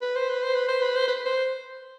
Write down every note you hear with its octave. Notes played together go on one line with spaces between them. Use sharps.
B4
C5
B4
C5
B4
C5
B4
C5
B4
C5